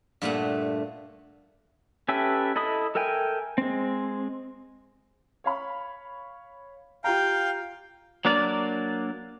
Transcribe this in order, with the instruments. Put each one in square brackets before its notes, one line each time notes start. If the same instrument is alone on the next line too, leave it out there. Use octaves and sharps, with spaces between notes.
[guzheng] G2 A#2 A3 F#5
[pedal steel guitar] C#4 G4 A4 B4 E5
E4 A4 D#5 B5 D#6
A4 A#4 E5 G5 G#5
G#3 C4
[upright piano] C#5 F5 B5
[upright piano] F4 G4 A#5 [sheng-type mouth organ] F5 G5
[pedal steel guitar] F#3 A#3 D4 A#4 D5